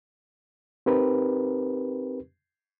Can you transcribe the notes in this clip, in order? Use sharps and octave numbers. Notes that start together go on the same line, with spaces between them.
C4 D#4 G4 A#4 B4